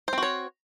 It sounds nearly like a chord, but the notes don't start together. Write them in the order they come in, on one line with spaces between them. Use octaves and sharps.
C5 C4 F#4 C#5